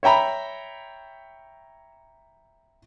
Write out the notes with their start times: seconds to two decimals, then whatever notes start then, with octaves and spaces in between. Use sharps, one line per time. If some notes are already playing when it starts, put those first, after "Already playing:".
0.03 C#5 E5 G5 A#5 B5